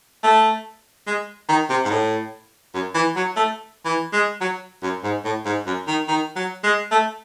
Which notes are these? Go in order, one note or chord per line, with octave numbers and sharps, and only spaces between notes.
A3
G#3
D#3
C3
G#2
A2
F#2
E3
F#3
A3
E3
G#3
F#3
F#2
G#2
A2
G#2
F#2
D#3
D#3
F#3
G#3
A3